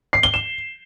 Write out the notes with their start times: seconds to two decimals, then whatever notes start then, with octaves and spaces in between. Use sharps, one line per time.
0.13 C7
0.23 G7
0.34 E7